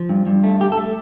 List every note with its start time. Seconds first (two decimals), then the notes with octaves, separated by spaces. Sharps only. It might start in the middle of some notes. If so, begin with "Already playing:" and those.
Already playing: F3
0.09 G2
0.27 G2
0.44 A3
0.60 A3 G4
0.72 A4
0.77 A3